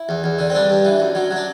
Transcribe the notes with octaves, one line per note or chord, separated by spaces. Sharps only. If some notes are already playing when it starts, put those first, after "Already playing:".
Already playing: E4
E2
E2
D3
C4
G2 D4
G2
E3
F#2
F#3
F#3
D4